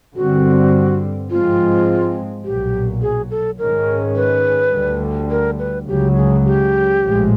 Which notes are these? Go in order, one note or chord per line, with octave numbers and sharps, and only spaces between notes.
G2 D3 G3 C4 F#4
G#2 F3 G#3 C4 F4
B1 A#2 F#3 G4
G#4
A4
G#2 D#3 G#3 C#4 A#4
B4
D2 D3 G3
A#4
B4
C#2 C#3 F#3 G4
G#4
G4
A#1 A2 F3 G#3